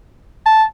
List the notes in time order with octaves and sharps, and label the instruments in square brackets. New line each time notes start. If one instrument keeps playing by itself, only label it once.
[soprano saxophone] A5